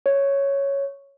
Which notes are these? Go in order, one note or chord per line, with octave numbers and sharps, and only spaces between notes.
C#5